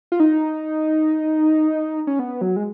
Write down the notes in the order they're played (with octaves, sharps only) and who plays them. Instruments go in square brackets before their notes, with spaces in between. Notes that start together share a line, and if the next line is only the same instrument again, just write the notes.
[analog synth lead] F4
D#4
C#4
B3
F#3
G#3